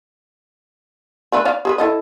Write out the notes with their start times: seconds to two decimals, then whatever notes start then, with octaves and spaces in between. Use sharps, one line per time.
1.32 A3 D4 B4
1.45 B4 D5 F5
1.65 G#4 A4 B4
1.78 E4 A4 D#5